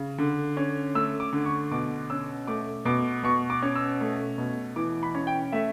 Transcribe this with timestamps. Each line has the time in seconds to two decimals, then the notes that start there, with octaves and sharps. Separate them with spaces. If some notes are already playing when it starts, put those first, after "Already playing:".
Already playing: C#3
0.18 D3
0.57 C#4
0.95 A3 E6
1.20 D6
1.33 D3
1.45 C#6
1.71 B2 D6
2.10 C#4 E6
2.47 A3 D6
2.85 B2 D6
3.23 B2 C#6
3.50 D6
3.62 C#4
3.76 E6
4.01 A3
4.38 B2
4.76 E3 D6
5.03 B5
5.15 C#4
5.27 G5
5.52 A3 E5